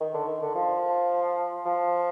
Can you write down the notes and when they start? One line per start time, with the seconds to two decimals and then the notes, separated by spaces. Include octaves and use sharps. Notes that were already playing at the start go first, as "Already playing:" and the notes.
0.01 D#3
0.14 D3
0.27 D#3
0.42 D3
0.55 F3
1.66 F3